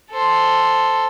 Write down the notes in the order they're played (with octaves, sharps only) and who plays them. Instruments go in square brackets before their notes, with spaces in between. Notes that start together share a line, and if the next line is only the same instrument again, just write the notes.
[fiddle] A4 C5